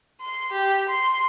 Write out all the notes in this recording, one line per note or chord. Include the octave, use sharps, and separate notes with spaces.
C6
G4
C6